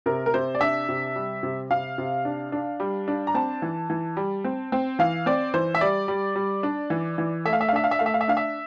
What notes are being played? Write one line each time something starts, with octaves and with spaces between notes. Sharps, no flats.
C3 A#4
A#4
C3 C5
D5
D4 E5
C3
G3
C3
C3 F5
C3
D4
D4
G3
D4
A#5
C4 A5
E3
E3
G3
C4
C4
E3 F5
C4 D5
E3 C5
E5
G3 D5
G3
G3
D4
E3
E3
A3 E5
F5
E5
F5
D4 E5
F5
E5
A3 F5
E5
F5
E5
D4 F5
E5